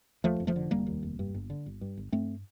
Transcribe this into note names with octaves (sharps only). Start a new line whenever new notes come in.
D#2 F3 A3
F1
F3 A3
D3
F1 G3 A#3
D#2
F1
G2
G1
D3
G1
G2
G1
G2 A3 C4